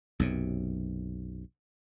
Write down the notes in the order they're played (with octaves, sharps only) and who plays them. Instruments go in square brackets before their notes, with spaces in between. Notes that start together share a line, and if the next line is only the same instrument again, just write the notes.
[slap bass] B1 F#2 C3